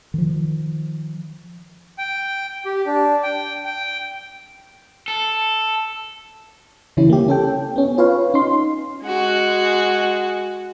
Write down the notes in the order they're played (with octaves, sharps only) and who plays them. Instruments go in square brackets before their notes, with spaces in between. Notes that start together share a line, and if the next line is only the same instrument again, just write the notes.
[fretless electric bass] D#3 F3
[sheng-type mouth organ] G5
G4
D4
G5
G5
[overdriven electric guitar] A4
[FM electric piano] C#3 E3 G3 C#4 E4
A#3 G4
C#4 A4 G5
B3 C#4
F4 B4 C#5 F5
C#4 D#4 C6
[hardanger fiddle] G#3 F#4